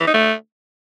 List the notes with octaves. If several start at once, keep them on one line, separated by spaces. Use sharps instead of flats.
E3
D#4
A3